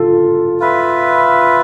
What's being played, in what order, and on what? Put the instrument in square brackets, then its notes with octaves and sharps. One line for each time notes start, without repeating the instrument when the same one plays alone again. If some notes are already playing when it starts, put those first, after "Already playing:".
Already playing: [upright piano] F4 A4
[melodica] F4 B4 E5